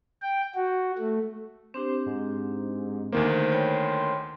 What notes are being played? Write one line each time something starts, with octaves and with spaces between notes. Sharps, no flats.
G5
F#4
A3
C4 D4 G4 C5
G#2
D2 D#3 A#3 C5
C#5 G5 B5